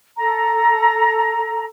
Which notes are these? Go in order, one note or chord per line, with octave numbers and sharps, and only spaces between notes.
A4 A#5